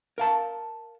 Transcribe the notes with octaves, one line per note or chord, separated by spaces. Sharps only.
A#4 F5 A5